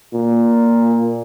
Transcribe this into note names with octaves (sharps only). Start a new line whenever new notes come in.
A#2